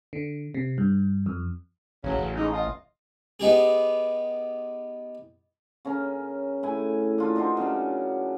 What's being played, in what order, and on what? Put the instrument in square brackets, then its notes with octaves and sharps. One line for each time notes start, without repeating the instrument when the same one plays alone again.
[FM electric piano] D3
C3
G2
F2
[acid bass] A1 [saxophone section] C#3 F#3
[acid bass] A1
[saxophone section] G#3 D#4
F4 D#5
[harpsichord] B3 D#4 G4 G#4
[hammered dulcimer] C#3 C#4 A#4 A#5
A2 E4 G#5
D4 F4 A#4
D4 D#4 F#4 C5
C#3 F#3 D4